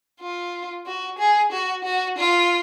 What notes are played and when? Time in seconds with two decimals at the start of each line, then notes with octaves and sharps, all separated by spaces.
0.20 F4
0.86 F#4
1.19 G#4
1.52 F#4
1.85 F#4
2.18 F4